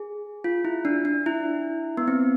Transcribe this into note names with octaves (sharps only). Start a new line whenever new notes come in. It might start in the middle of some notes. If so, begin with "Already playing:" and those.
Already playing: G#4
F4
E4
D4
D4
E4
B3
C4